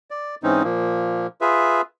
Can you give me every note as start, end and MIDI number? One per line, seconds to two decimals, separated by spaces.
0.11 0.35 74
0.43 0.63 44
0.43 0.63 52
0.43 0.63 60
0.43 0.63 61
0.43 0.63 63
0.63 1.27 46
0.63 1.27 53
0.63 1.27 58
1.41 1.81 65
1.41 1.81 68
1.41 1.81 71
1.41 1.81 76